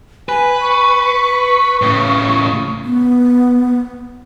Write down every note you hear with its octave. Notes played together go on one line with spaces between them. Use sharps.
B4 G#5
C#6
A2 C#3
B3